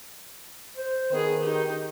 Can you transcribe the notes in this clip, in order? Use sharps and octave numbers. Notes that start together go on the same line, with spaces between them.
C5
D#3 B3 G#4
D#4 G4